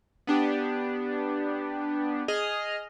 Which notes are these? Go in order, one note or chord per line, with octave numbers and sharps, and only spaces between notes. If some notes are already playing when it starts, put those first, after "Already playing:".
B3 D4 G4
G#4 D#5 F6